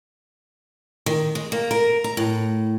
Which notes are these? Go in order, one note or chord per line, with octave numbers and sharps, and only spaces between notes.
D#3
G#3
A#3
A#4
A#5
A2